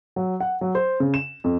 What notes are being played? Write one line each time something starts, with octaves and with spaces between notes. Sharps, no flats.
F#3
F#5
F#3
C5
C#3
E7
F2